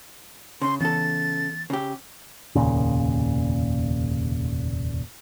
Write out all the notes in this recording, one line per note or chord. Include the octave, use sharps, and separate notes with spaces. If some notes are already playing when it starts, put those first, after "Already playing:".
C#3 C6
C#3 E3 B3 A4 A6
C#3 G4
F1 D#2 A#2 C#3